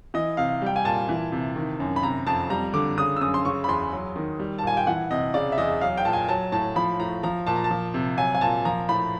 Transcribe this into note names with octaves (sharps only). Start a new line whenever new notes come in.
E3 D#5
C3 F5
G3 G5
G#5
A#2 A5
E3
C3
D#3
F#2
B5
C3 A#5
F2 A5
G3 A#5
D3 D6
C#3 D#6
E6
F#2 D#6
C6
C#3 C#6
B5
E2 C6
F#3
D#3
G3
A5
A#2 G#5
G5
E3 F#5
C3 D#5
C#3 D5
E5
E2 D#5
F#3 F5
G5
A#2 A5
G#5
F#3 A5
A2 A5
F3 B5
A2 A#5
F3 A#5
A#2 A5
A#5
A5
F3
C3
F#3 G#5
G#5
A#2 A5
F3 A#5
A2 B5